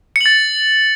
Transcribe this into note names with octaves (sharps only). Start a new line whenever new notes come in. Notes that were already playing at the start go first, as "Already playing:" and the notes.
A6 C#7 F#7